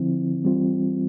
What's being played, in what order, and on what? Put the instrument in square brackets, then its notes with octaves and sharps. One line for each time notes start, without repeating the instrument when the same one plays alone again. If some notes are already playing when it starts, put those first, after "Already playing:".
Already playing: [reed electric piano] D3 F3 C4 E4
E3 G3 C4 F4